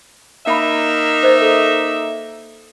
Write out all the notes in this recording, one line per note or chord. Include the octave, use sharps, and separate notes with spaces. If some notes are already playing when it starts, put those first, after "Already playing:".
A#3 D#4 E5 F5 B5
C5 D#5
A4